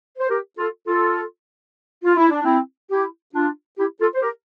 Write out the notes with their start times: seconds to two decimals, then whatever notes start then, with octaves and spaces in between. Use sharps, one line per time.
0.19 C5
0.29 G4 A#4
0.58 F4 A4
0.87 F4 A4
2.04 F4
2.17 E4
2.31 D4
2.44 C4 E4
2.91 E4 G4
3.35 D4 F4
3.79 E4 G4
4.01 F4 A4
4.15 C5
4.22 G4 A#4